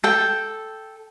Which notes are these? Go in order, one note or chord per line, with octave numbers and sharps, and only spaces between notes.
A4 G5